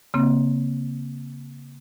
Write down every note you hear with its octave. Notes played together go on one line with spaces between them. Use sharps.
C#3 A#3 C4